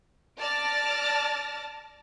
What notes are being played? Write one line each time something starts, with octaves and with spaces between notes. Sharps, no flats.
D5 A5 D6 F6 A6 A#6